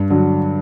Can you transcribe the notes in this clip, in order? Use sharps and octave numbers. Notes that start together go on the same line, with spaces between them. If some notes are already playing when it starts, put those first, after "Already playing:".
Already playing: G2
D3 F#3